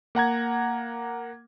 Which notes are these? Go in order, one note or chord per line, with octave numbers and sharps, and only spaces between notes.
A#3 F#5 A#5 G#6